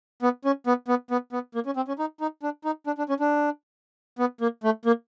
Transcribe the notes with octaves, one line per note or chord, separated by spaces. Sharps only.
B3
C#4
B3
B3
B3
B3
A#3
C#4
C4
C#4
D#4
D#4
D4
D#4
D4
D4
C#4
D4
B3
A#3
A3
A#3